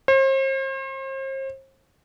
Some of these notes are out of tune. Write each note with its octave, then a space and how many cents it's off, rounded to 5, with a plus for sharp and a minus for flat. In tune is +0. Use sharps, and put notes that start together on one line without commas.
C5 +40